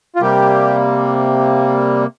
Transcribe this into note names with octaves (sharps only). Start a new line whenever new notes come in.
F4
C3 G3 A#3 G4